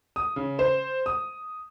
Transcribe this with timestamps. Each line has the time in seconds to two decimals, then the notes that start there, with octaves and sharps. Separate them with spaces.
0.16 D#6
0.36 C#3
0.59 C5
1.06 D#6